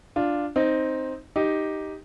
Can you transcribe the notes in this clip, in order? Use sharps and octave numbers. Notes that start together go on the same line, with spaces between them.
D4 F4
C4 D#4
D#4 G4